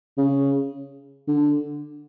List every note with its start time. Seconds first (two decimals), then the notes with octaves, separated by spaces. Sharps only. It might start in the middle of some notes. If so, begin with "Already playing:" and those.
0.18 C#3
1.28 D3